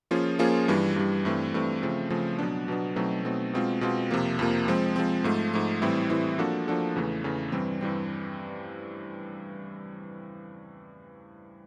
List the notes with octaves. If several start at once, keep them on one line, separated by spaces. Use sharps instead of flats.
F3 A#3 C#4 F4 G#4
F3 A#3 C#4 F4 G#4
G2 E3 G3
G2 E3 G3
G2 E3 A3 C4
G2 E3 A3 C4
C#3 F3 A3 C4
C#3 F3 A3 C4
B2 F#3 B3 D4
B2 F#3 B3 D4
B2 F#3 A3 C4 D#4
B2 F#3 A3 C4 D#4
B2 G#3 C4 F4
B2 G#3 C4 F4
F2 C3 F3 A#3
F2 C3 F3 A#3
F3 G#3 C4
F3 G#3 C4
G#2 F3 A3
G#2 F3 A3
A2 E3 G3 C4 E4
A2 E3 G3 C4 E4
F3 A#3 D4 F#4 A4
F3 A#3 D4 F#4 A4
E2 C#3 E3 A3
E2 C#3 E3 A3
G2 E3 G3 C4
G2 E3 G3 C4